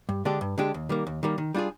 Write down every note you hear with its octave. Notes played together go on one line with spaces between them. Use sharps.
G2
D3 G#3 D4 G4
G2
D3 G#3 D4 G4
D#2
D#3 G3 A#3
D#2
D#3 G3 A#3
D#3
G3 D4 F4 G#4